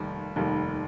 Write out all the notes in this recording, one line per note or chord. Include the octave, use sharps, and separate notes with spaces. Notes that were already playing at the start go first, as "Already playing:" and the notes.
Already playing: F1 D#2 D#3 G3
F1 D#2 D#3 G3